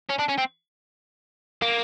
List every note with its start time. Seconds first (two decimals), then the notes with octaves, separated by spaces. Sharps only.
0.10 C#4
0.19 D4
0.29 C#4
0.38 C4
1.62 A#3